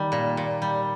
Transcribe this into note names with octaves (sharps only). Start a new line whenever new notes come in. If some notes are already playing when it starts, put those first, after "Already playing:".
Already playing: D#3 G3
A#2
A#2
G3